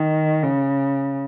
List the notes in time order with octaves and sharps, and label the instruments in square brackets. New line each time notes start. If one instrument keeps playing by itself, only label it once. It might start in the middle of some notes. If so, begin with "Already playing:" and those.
Already playing: [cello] D#3
C#3